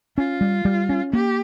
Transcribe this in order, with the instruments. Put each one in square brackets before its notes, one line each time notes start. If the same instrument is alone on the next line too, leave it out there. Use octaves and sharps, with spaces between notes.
[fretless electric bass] C#4 [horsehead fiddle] F4
[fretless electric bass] G3
G3
C#4
[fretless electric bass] A#3 [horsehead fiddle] G4